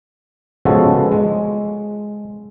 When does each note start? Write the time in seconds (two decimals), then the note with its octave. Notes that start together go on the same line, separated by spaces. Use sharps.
0.65 C#3 F3 G#3 B3 F#4 A4
1.12 G#3